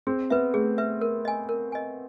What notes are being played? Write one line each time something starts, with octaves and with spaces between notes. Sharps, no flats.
C4 G#4
B3 B4 E5
A3 G#4
B4 E5
A#4
D#5 G#5
A#4
D#5 G#5